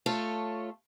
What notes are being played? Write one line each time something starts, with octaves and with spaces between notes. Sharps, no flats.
A3 F4 A4 C#5